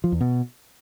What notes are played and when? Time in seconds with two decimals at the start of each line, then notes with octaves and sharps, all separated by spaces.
0.04 F3
0.12 E2
0.21 B2